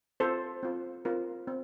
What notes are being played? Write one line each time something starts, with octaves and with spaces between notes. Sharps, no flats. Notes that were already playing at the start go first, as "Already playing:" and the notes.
C4 F4 A4 C5
C4 F4
C4 F4 A#4
C4